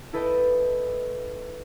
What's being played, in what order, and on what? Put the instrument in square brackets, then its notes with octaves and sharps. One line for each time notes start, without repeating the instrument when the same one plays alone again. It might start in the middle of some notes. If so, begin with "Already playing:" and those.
[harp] E4 A4 B4 D#5 G5 A5